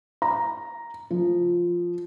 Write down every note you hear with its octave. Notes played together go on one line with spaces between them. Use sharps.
A#5
F3